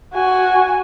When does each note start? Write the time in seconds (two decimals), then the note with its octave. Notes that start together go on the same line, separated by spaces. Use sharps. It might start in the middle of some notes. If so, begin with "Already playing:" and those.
0.13 F#4 G#5